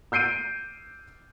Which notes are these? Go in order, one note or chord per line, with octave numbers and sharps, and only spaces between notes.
E6 G6 C7 D7 D#7